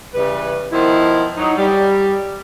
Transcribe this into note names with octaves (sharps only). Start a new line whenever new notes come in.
C#3 E3 G3 B4
B2 D#3 F3 E4
F#3 D#4
G3